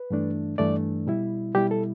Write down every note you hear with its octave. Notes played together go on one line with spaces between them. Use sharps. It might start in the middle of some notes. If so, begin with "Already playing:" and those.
Already playing: B4
G2 E3 A3 D4
G2 E3 A3 D4 D5
B2 G3 E4
B2 G3 E4 G4
A4